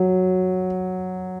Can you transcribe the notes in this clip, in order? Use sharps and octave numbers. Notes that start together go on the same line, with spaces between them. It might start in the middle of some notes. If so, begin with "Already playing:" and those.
Already playing: F#3